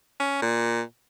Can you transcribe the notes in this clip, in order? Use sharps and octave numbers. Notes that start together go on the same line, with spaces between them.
C#4
A#2